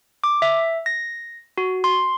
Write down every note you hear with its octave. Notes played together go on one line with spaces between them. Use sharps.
D6
E5
A#6
F#4
C6